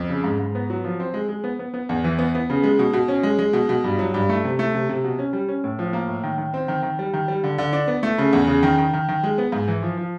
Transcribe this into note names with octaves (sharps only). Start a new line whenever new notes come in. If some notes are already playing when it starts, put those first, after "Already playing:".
Already playing: F2
C#3
G#2
G#2
B3
F#3
F3
C4
G#3
G#3
B3
B3
B3
E2
E3
B3
B3
C#3
G#3
B2
B2
C#4
G#3
G#3
B2
B2
G2
F#3
G2
A3
C3
A3
C3
C3
B2
C#4
G3
C#4
A2
F3
A#3
A2
D#3
D#3
C4
D#3
D#3
G3
D#3
G3
D3
D3
D4
B3
A3
C#3
E2
C#3
D#3
D#3
D#3
D#3
G#3
B3
G#2
E3
F3
F3